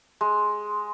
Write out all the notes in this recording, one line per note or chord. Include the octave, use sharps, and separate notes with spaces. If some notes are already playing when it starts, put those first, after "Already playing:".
G#3